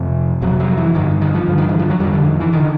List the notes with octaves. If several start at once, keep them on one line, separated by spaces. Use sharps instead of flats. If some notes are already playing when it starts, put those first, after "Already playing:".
Already playing: F2 C3
F2 C3 F#3
F#3
E3
G2 D3 D#3
D#3
F3
G2 D3
D#3
E3
F3
F#3
F2 D3 G3
D3
D#3
E3
D3 D#3